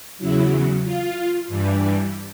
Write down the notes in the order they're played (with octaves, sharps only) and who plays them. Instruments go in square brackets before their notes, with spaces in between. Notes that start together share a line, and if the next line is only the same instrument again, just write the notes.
[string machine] E2 C#3 F#3 E4
F4
G2 E3 G3